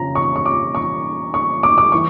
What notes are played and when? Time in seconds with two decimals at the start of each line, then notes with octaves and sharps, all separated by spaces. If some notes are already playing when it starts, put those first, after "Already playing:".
Already playing: F2 C#3 F3 A#5
0.15 C#6
0.36 C#6
0.46 D6
0.75 C#6
1.34 C#6
1.63 D6
1.78 D6
1.92 E3 C#6